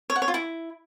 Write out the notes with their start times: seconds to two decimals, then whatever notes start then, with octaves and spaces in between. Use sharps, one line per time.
0.10 C#5
0.16 F#5
0.22 C#5
0.28 F4
0.34 E4